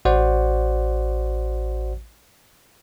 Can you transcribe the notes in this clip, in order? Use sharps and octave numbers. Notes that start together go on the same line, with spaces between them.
A1 F#4 C5 D5 F#5